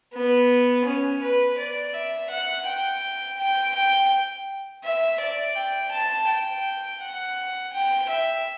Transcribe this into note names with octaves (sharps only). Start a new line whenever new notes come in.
B3
C#4
B4
D5
E5
F#5
G5
G5
G5
E5
D5
G5
A5
G5
F#5
G5
E5